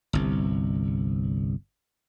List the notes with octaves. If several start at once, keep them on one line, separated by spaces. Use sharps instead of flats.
G1 C2